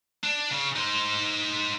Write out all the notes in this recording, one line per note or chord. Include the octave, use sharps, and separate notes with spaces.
D4
C#3
D#4 C5